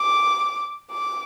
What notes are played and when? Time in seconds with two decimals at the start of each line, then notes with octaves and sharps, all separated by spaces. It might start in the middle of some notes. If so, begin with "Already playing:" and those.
Already playing: D6
0.92 D6